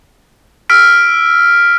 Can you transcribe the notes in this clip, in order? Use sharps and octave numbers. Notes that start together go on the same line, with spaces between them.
E6 F6 B6 D7